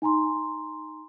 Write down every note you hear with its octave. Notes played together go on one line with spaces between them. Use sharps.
D#4 G#5 A#5 C6